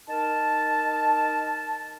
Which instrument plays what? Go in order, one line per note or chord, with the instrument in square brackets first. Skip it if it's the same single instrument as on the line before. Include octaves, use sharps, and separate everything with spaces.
[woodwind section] D#4 A#4 A5